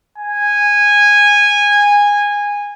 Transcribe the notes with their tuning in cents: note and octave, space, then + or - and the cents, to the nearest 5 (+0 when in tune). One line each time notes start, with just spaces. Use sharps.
G#5 -15